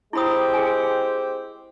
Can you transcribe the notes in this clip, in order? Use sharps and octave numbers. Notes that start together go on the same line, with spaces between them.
G#3 C4 E4 G4 B5 D#6
G#4 G#5